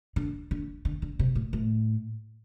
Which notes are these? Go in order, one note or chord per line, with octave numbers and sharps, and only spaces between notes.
D3
D3
D3
D3
C3
A2
A2